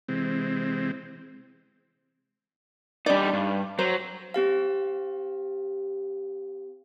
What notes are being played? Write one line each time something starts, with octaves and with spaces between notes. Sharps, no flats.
C3 E3 G#3 C4
G3 D4 D#4 D5
G2
F#3 C5
C4 G4 F5